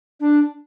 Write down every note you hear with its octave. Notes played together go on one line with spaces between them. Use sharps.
D4